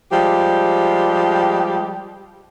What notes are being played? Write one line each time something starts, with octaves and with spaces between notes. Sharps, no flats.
F3 G3 G#3 G4